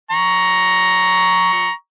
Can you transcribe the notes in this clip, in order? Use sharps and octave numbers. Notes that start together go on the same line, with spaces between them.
A#5 C#6